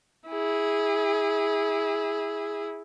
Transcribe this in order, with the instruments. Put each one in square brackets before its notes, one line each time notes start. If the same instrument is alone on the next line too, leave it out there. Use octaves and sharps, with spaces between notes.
[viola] E4 G#4